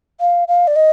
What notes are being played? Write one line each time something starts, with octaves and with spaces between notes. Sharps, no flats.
F5
F5
D5
D#5